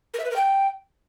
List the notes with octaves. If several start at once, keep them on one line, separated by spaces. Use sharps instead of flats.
A#4
E5
B4
A#4
G5